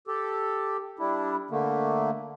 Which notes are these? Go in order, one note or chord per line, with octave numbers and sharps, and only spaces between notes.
G4 A4
G3 D4 E4
D3 A3 A#3